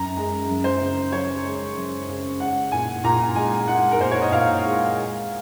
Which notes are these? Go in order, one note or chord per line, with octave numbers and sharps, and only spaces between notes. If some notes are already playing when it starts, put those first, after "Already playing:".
Already playing: F#2 A#5
G#3
F#2
C5
C#3
F#2 C#5
G#3
F#2
C#3
G#3 F#5
A#2 G#5
A#2 A#5
G#3 G#5
G#3 F#5
A#4
A#2 C5
C#5
D#5
A#2 F5
G#3
G#3